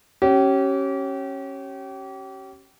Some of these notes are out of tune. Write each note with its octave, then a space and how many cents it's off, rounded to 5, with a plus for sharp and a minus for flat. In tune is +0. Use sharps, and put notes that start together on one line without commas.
C#4 -15 G4 -35